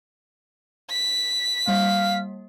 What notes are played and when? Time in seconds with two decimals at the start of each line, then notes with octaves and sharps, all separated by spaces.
0.91 B6
1.68 G3 A#3 F5